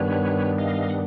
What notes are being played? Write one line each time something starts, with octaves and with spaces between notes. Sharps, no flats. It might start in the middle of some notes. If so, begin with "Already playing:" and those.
Already playing: G2 D#3 G3 B3 D4 B4 C#5
D#5 F5
F#5